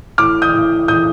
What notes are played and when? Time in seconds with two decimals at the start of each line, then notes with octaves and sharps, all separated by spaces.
0.18 A2 D6 F6
0.42 D#6 G6
0.54 A2
0.88 A2 D#6 G6